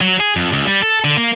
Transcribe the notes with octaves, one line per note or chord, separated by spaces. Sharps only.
F#3
G#4
F2
C#2
G3
A4
D3
A#3